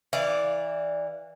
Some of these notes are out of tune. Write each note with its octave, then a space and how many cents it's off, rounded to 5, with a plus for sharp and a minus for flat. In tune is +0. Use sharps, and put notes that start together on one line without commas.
E3 -15 D5 -5 F5 -20